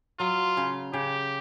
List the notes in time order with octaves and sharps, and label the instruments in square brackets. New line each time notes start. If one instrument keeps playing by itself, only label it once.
[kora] F#3 [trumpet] F4
[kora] C#3
[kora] C#3 [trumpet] G4